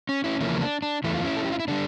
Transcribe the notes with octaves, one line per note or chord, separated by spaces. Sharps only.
C#4
C#4 E4
E2 C#3 F3 A#3 C#4 E4
D4
D4
E2 E3 A3 E4
F4
C#4 E4
A4
G4
F4
E4
D3 G3 D4